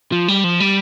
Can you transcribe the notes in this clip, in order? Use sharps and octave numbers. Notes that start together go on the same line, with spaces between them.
F3
G3
F3
G3